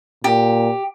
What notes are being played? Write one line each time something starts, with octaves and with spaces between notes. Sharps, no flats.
A#2 G4